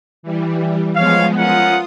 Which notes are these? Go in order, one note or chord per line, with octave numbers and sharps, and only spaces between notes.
E3 G3
F3 G#3 B3 C#5 F5
C#4 F4 A#4 F#5 D#6